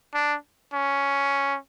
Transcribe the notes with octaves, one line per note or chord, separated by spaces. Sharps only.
D4
C#4